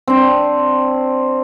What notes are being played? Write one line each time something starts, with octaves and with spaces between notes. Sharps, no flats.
C4 D4